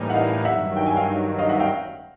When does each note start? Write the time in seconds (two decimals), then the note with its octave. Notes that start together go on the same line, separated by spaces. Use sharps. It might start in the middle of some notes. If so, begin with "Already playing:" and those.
Already playing: A2 E3 G3 A#3 D#4
0.10 F#5
0.14 D#5 F5
0.45 G2 D#3 F#3 E5 F#5
0.77 G5
0.86 G#5
0.96 F5 G5
1.38 D#5 F5
1.49 E5 F#5
1.60 F5 G5